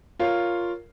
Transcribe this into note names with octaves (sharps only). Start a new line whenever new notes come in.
F4 A#4 C#5 F5